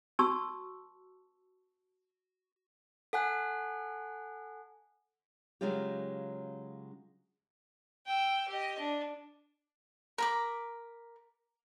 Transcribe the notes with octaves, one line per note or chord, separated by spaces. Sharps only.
F#4 A5 C#6 E6
A4 F#5 G#5 F#6
C#3 F#3 G#3 C#4 F4 G4
G5 E6
G4 D#5
D4
A#4 B5 D6